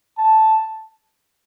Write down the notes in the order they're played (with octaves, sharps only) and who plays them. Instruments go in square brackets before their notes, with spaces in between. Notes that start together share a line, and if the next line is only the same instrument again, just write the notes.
[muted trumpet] A5